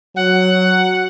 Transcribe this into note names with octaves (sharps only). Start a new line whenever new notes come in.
F#3 F#5